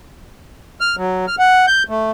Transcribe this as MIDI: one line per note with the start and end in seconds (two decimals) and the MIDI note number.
0.81 0.96 89
0.97 1.26 54
1.28 1.35 89
1.39 1.66 78
1.67 1.83 91
1.89 2.11 57